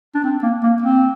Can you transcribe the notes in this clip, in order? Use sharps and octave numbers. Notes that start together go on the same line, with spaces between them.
D4
C4
A#3
A#3
C4